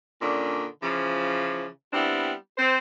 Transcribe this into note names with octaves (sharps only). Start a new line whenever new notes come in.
A#2 D3 D#3 C#4 D4
C#3 E3 F3
G3 B3 C4 D4 E4
C4 C5